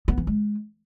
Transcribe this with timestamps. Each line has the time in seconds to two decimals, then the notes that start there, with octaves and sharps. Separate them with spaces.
0.08 B3
0.18 E3
0.27 G#3